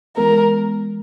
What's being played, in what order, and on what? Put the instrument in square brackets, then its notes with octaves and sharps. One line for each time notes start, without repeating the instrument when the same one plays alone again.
[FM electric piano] E3 G#3 B3 [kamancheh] A#4